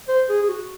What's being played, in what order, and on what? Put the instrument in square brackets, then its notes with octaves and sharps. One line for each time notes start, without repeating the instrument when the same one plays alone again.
[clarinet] C5
G#4
G#4
F#4